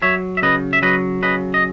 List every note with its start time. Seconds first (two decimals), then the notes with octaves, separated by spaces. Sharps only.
0.02 F#3 C#5 E5
0.37 E5
0.42 C#3 B4 D#5
0.73 E5
0.82 F#3 B4 D#5
1.23 C#3 B4 D#5
1.54 D#5